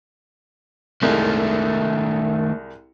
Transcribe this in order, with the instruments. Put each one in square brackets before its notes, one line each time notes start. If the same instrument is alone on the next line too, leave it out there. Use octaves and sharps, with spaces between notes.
[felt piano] C2 G#3 [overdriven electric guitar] D#3 A3